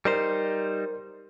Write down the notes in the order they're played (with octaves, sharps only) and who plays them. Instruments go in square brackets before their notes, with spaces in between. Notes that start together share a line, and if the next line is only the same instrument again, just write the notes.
[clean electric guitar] G3 D#4 C5 [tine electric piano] A#4